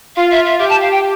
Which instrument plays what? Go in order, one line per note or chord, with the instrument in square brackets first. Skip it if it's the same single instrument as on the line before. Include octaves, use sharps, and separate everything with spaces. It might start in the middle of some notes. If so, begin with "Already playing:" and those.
[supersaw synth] F4 [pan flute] F5
[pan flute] E5
E5
[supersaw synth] G4 [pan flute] E5
[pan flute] A5
F5
G5